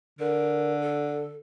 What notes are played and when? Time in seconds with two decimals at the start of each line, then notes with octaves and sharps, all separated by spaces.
0.19 D3 A#4
0.83 A4